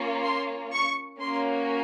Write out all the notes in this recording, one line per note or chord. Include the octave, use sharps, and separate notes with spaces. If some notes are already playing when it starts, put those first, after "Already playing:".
Already playing: A#3 C#4 F4
C6
C#6
A#3 C#4 F#4 C6